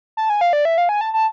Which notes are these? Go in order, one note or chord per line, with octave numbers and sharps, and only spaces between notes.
A5
G#5
F5
D5
E5
F5
G#5
A5
A5